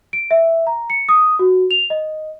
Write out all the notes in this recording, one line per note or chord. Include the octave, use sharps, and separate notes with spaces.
D7
E5
A#5
C#7
D#6
F#4
F7
D#5